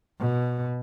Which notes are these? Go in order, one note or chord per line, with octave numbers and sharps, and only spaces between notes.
B2